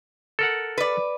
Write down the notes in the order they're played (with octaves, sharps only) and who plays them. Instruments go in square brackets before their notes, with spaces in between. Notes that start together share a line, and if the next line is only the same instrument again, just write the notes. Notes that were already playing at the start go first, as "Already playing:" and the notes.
[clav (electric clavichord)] A4 A#4 F#5
[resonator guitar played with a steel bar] B4 D5